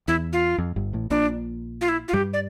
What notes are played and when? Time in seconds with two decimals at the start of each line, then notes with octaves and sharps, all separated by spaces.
0.08 E2 E4
0.33 F4
0.58 F2
0.76 G1 G2
0.93 A1 A2
1.10 A#1 A#2 D4
1.81 F4
1.89 E4
2.08 F4
2.13 G2 G3 G4
2.33 D5